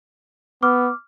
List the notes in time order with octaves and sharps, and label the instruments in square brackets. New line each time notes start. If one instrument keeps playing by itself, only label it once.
[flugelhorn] B3 [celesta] D6 F6